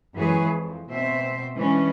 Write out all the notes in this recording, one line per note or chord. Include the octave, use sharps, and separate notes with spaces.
F#2 E3 G#3 G#4 B4 C#5
F2
B2 C4 C5 E5
E3 G#3 C#4 D4